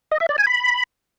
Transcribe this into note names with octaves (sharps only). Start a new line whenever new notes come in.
D#5
E5
D5
G#5
B5